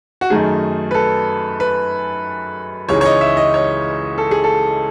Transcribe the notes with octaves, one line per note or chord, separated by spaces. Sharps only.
F#4
F#2 D#3 A3 D#4 G#4
B4
A4
B4
C#2 C#3 E3 G#3 D#4 C#5
C#5
D#5
E5
D#5
C#5
A4
G#4
A4